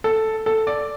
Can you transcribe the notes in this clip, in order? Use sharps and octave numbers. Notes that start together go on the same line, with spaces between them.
A4
A4
D5